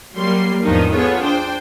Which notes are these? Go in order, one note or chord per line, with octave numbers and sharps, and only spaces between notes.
F#3 G3 A#3 C6 C7
E2 G#2 D#3 F3 D4 D#4
B3 F4 G#4 A4 C#5
D4 C5 G5